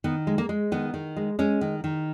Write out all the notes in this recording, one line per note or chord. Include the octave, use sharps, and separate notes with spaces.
D#3 B3
G#3
A#3
G#3
D#3 B3
D#3
G#3
G#3 C#4
D#3
D#3